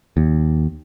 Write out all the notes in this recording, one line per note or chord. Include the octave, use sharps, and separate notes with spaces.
D#2